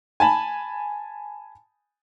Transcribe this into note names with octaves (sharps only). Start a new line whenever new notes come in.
G#5 A5 B5